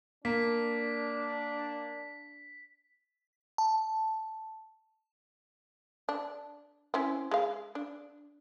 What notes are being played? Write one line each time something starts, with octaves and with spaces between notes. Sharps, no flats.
A#3 D4 B6
A5
D4
C4 C#4 E4
G#3 F5
D4